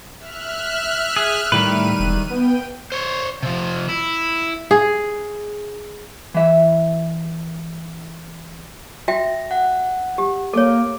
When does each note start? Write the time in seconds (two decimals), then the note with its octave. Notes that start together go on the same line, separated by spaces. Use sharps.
0.18 E5 F6 F#6
1.16 G#4
1.52 A2 D#3 G3 B4 D#7
2.00 E1
2.30 B3 G5
2.92 C5 C#5
3.42 C3 F3
3.88 E4
4.71 G#4
6.34 E3 E5
9.08 F#4 E5 G5 A#6
9.51 F#5
10.18 G4
10.53 A#3 A4 C#5 D6